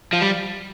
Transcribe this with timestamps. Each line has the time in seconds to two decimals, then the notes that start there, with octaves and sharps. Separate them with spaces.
0.13 F3
0.22 G3